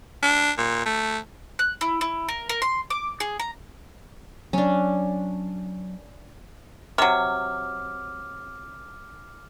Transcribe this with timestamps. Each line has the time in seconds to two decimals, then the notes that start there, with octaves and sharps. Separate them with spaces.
0.23 D4
0.58 A#2
0.86 A3
1.59 F#6
1.81 E4
2.01 E4
2.29 A#4
2.49 A#4
2.62 C6
2.90 D6
3.20 G#4
3.40 A#5
4.53 F#3 C#4 D4
6.98 C3 F#3 D6 F6